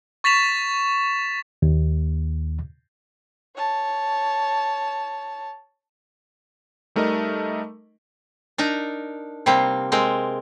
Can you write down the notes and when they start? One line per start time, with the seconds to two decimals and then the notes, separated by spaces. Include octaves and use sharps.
0.24 C#6 A6 B6 E7 F7
1.62 D#2
3.56 C#5 A5
6.96 G3 A3 D#4 A#4 D#5
8.58 D4 D#4 A#4 A#5
9.46 C3 G3 A#3 C4
9.92 G#3 C4 A#4